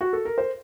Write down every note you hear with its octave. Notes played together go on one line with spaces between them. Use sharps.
F#4
A4
A#4
C5